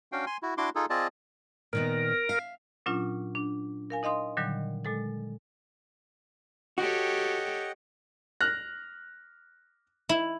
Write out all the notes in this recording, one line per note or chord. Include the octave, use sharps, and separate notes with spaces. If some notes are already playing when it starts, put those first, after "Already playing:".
C#4 D4 F#4 F5 G5
G#5 C6
E4 F#4
D4 E4 F#4 C6 D6
D#4 F4 G#4 A4
C4 F4 G#4 D5 D#5 A5
A#2 D#3 B3 A#4
E5 F5
A#2 F#3 C#4 D4 F4
D4
A#4 F5 G#5
D#4 D#5 F5 C6 D#6
A#2 D3 D#3 F#3 G3
A#2 G#3 A4 A6
F#4 G4 A4 C#5 D#5 F#5 G5
F6 F#6 A#6
E4